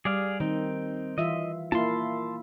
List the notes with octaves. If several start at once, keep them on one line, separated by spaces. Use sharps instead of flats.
G3 G#4 D5 F5
D#3 C4 D#4
E3 F4 D#5 E5
A#3 E4 F4 A5 C6